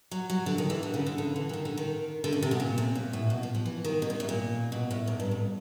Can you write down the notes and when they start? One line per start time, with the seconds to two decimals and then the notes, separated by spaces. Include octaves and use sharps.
0.11 F#3
0.30 F#3
0.46 D3
0.58 D#3
0.70 E3
0.83 D3
0.94 C#3
1.06 D3
1.18 D3
1.36 E3
1.49 E3
1.53 D#3
1.65 D3
1.77 D#3
2.24 D3
2.33 C#3
2.43 C3
2.51 B2
2.60 A#2
2.78 C3
2.95 A#2
3.13 A2
3.30 B2
3.43 F3
3.55 F3
3.66 E3
3.84 D#3
4.02 B2
4.10 A#2
4.20 A2
4.29 A#2
4.72 B2
4.91 A2
5.07 G#2
5.20 G2
5.31 F2